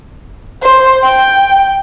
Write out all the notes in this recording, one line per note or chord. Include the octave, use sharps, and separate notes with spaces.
C5
G5